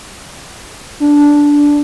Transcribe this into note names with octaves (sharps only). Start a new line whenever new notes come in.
D4